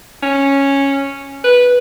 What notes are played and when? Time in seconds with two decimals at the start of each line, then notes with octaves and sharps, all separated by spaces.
0.23 C#4
1.44 B4